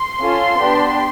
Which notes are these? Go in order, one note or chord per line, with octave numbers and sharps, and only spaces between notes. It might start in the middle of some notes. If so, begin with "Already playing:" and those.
Already playing: C6
C#4 F4 A4
B3 D4 G4